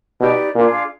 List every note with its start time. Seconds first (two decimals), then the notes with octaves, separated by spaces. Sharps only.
0.20 B2 D#4 G4 B4 D5
0.55 A#2 D4 F4 G#4